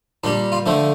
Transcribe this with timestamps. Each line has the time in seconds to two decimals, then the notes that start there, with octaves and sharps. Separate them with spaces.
0.24 A#2 G3 D4
0.52 F4
0.66 D3 F3 A3